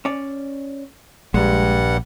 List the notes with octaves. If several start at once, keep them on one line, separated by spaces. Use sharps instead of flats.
C#4 D5
A#1 G2 G3 G#3 F#5